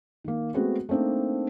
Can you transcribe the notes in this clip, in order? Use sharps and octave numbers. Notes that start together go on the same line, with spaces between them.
D#3 A#3
G#3 A3 B3 C4 F#4 G#4
A3 A#3 C4 D4 D#4